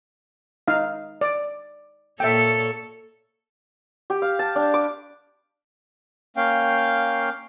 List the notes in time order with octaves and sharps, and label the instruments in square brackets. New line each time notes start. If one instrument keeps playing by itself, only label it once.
[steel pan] D#4 F5
D5
[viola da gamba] A#2 A4 C#5 [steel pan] E5 G5
[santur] G4
F5
A5
D4
D6
[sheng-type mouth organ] A#3 C#4 F5 G5